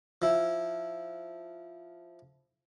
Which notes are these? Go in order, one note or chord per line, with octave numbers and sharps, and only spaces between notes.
F3 E4